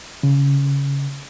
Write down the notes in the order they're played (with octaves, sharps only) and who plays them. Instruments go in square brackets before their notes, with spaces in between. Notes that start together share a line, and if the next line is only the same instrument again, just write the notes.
[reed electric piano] C#3